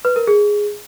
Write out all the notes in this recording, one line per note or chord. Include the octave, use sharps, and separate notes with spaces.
B4
A#4
G#4